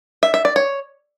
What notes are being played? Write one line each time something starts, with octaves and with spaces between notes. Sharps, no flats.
E5
E5
D5
C#5